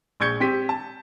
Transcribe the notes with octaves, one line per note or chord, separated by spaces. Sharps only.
A#1 C#6 G6 G#6 C#7 G7
C4 G4 B6 D#7
A5